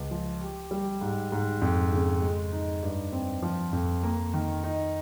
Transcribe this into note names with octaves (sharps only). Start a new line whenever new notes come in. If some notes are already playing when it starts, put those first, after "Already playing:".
Already playing: C#2
F3
G4
G3
G#2
G#2
F2
C#3
G#3
D#4
G2
C4
F3
F2
A#3
D#3
D#4